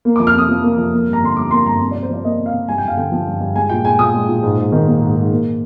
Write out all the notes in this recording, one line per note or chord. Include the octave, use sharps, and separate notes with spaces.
A#3
D6
F2
F6
C3 D#6
F3
A#3
F2
A#3
G2
A#5
D3 C6
G3 D6
A#3 C6
G2 A#5
C3
D5
C3
C5
F3 D5
A#3 D#5
C3
F5
C3
G2 G#5
G2 G5
F5
D3 G5
F3
G2
G2
G#3 G#5
A#2 G5
G#3 G#5
A#2 D#6
G#3
A#2
G#2
G#2
D#3
A#3
G#2
G#2
A#3